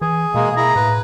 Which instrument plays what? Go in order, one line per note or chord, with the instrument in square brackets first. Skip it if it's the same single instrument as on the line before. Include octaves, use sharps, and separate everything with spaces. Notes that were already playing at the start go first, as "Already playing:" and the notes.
[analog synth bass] E3 [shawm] G#4
[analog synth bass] B2 [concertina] G#3 A#3
[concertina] A#3 E4 G#4 [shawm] A#5
[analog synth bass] A2 [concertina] B4